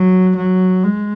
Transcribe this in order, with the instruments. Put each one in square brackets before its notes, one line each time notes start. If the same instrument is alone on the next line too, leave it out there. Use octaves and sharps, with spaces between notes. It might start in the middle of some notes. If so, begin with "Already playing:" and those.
Already playing: [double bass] F#3
F#3
G#3